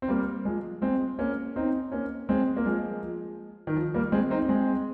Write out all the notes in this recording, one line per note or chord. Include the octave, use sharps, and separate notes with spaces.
C4
G3 A#3
F3 G#3
G#3 C4
A#3 C#4
C4 D#4
A#3 C#4
G#3 C4
A#3
F3 G#3
D#3
F3
G3 A#3
G#3 C4
C4 D#4
G#3 C4